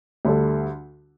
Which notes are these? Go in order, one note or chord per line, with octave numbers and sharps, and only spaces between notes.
D2 D3 G3 D4 A4